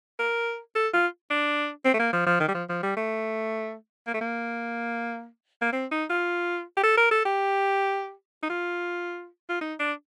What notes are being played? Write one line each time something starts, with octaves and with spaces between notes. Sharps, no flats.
A#4
A4
F4
D4
C4
A3
A#3
F3
F3
D#3
G3
F3
F3
G3
A3
A#3
A3
A#3
A#3
C4
D#4
F4
G4
A4
A#4
A4
G4
D#4
F4
F4
D#4
D4